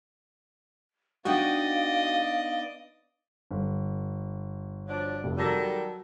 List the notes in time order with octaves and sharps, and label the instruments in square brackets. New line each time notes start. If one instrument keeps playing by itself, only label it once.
[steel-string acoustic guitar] B3 D4 D#4 [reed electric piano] F#4 G5 [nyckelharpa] D5 D#5 [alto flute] F5
[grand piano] G1
[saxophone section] F3 F#3 D4
[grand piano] F1
[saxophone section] D#3 G3 A4 [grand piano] F#3 E6 A#6